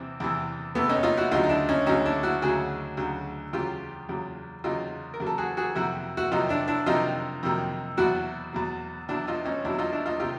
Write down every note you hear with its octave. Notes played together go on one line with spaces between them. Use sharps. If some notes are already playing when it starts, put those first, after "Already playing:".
Already playing: E2 C3 E3 C4
E2 C3 E3
E2 C3 E3 A3 B3
C#4 D#4
D#4 F4
E4 F#4
D2 C#3 F#3 D#4 F4
D#4
D4 E4
C#4 D#4
D2 C#3 F#3 C#4 D#4
D4 E4
E4 F#4
D2 C#3 F#3 F#4 G#4
D2 C#3 F#3
E2 C#3 F#3 F4 G4
E2 C#3 F#3
E2 C#3 F#3 D#4 F4
A#4
E2 C#3 F#3
A4
F#4 G#4
F#4 G#4
F2 C3 D#3 F#3 E4 F#4
E4 F#4
F2 C3 D#3 F#3 D#4 F4
D4 E4
D4 E4
F2 C3 D#3 F#3 D#4 F4
F2 C3 D#3 F#3
E2 B2 F#3 E4 F#4
E2 B2 F#3
E2 B2 F#3 D4 E4
D#4 F4
C#4 D#4
E2 B2 F#3 D4 E4
D#4 F4
D4 E4
D#4 F4
C3 D#3 F4 G4